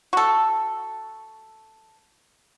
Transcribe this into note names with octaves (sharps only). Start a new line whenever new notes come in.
F#4 A4